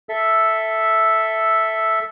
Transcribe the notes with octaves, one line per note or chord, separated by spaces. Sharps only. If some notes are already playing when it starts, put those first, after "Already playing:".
A4 E5